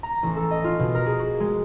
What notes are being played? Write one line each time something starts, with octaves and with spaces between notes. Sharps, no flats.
A#5
A1
A4
D#5
F4
B2
A#4
G#4
F#4
G#3